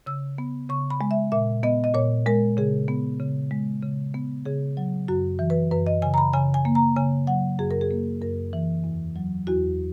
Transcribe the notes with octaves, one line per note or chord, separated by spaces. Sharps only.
C#3 E6
B3
C#3 C#6
B5
G#3
E5
A#2 E5
B3 D#5
D#5
A#2 C#5
G#3 A#4
C#3 G#4
B3
C#3
G#3
C#3
B3
C#3 G#4
F#3
F#2 F#4
E3
B4
F#2 B4
D#5
C#3 G#5
A#5
B5
C#3 G#5
G#5
A#3
A#5
C#3 G#5
F#3 F#5
F#2 G#4
A#4
G#4
A#3
F#2 A#4
E3
E2
F#3
E2 F#4